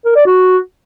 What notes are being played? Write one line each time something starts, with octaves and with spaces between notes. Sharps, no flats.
A#4
D5
F#4